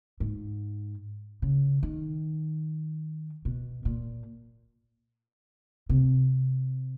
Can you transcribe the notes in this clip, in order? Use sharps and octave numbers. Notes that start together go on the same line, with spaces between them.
G#2
C#3
D#3
B2
A#2
C3